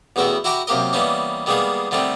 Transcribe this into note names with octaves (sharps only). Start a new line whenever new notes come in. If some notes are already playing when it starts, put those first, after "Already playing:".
A1 E2 B3 F#4 E5 G5
E4 F#4 G4 F#5 A#5 D6
F#2 C3 A#3 G4 A#4 D#5
E3 G3 A#3 B3 C#4 D#4
D#3 G3 G#3 A#3 B3 G#4
D3 D#3 G3 A3 C4 G4